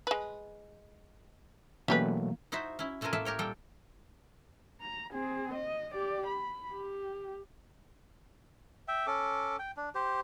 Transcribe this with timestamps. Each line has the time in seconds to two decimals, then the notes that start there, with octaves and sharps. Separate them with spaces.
0.07 G#3 B4
1.88 B2 E3 F#3 A3 A#3 C#4 G4 B4
2.52 D#4 E4 F#4 C5 E5
2.79 C#4 E4
3.01 B2 A3 C#4 F4 A#4 G#5
3.13 A2 A3 A#3 E5 A5
3.25 G4 A#4 C#5 G5
3.39 A#2 G3 A4 G5
4.80 A#5
5.13 C4 G#4
5.54 D#5
5.93 G4 D5
6.27 B5
6.72 G4
8.88 E5 G5
9.07 C#4 A4 D6
9.59 G5
9.77 D4
9.95 G4 C5